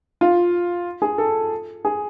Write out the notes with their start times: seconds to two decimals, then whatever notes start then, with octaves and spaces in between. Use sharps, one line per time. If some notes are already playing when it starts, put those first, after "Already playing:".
0.21 F4
1.02 G#4
1.18 A4
1.85 G#4